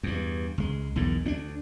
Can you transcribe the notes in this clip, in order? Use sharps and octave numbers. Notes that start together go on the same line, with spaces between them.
E2 G2
C#2 G#3
B1 E2 G#2 D#3
D2 C#4 D4